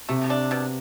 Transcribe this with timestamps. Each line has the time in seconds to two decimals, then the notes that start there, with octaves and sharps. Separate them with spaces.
0.09 C3 A3
0.30 D4
0.51 B2